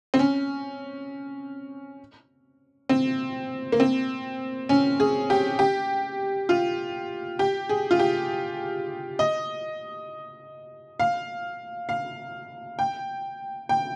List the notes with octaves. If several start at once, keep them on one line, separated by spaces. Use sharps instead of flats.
C4
C#4
C4
A#3
C4
C#4
G#4
G4
G4
F4
G4
G#4
F4
G4
D#5
F5
F5
G5
G5